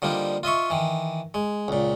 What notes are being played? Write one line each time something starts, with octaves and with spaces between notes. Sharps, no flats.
D3 F3 G3 A#3 D#4
F4 D#5 E5 C#6
D#3 E3
G#3
C#2 A#2